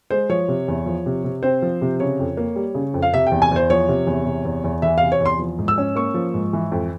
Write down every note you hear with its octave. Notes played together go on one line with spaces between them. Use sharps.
G#3 C5
F3 C#5
C3
E2
F3
C3
C3
C4 C5
F3
C3
C#3 C#5
F2
A#3
G3
C#3
F2
F5
C3 E5
G5
E2
G#5
E2 C5
F3 C#5
C3
E2
C3
E2
E2
E3 E5
C3 F5
C#5
E2 C6
F3
G#2
E6
C#4
A#3 C#6
F3
G#2
E3
F2